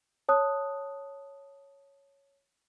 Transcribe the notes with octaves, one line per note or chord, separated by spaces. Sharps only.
C#5 A5 D#6 F#6